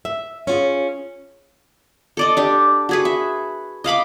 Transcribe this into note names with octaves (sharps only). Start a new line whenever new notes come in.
E5
C#4 F4 G#4
A4 D5 D#5
D4 G4
F#4 G#4 B4
E5
D#5 F5 B5 D6